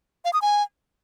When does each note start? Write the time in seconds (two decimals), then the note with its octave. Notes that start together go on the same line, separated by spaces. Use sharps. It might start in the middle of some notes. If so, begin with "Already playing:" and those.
0.25 F5
0.33 D#6
0.42 G#5